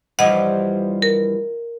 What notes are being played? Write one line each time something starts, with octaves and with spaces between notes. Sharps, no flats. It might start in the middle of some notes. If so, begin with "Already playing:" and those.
G2 E3 F3 D#5 F#5
A#4